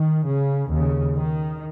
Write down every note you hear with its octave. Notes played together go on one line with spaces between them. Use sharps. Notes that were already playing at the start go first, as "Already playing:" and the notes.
Already playing: D#3
C#3
D#2 C#3
D#3